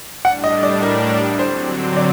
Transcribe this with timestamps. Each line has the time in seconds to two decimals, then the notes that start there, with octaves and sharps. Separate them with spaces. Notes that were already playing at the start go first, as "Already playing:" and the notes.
0.25 A2 G3 D4 F#5
0.44 D#5
0.63 D5
0.82 A#4
1.39 D3 F#3 C4 C5
1.97 D5